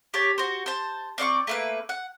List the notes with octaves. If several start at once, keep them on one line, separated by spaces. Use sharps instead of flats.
G4 C#5 A5
F#4 C5
C5 A5
C4 D5 F5 C#6
A3 A#3 B4
F#5